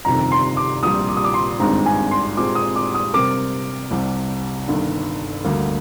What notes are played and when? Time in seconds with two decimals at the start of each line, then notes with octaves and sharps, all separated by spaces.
0.05 G1 F2 C3 D#3 A#5
0.32 C6
0.57 D6
0.83 A#1 A#2 G3 D#6
1.09 D6
1.17 D#6
1.24 D6
1.34 C6
1.59 G#1 G2 D#3 G#3 C4 A#5
1.86 G#5
2.11 C6
2.37 A#2 G#3 C4 D6
2.55 D#6
2.76 D6
2.95 D#6
3.14 C3 G3 C4 G4 A#4 D6
3.91 C2 C3 G3
4.68 G1 G2 D#3
5.45 D2 D3 G3 A#3